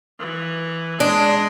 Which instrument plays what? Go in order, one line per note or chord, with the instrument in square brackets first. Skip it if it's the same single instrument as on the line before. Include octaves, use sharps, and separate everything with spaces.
[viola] E3
[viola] G#3 D#5 [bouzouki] D4